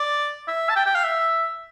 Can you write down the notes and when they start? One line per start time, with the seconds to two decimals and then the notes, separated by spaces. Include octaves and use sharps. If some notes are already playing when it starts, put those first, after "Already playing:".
Already playing: D5
0.48 E5
0.70 A5
0.76 G5
0.86 G5
0.95 F5
1.04 E5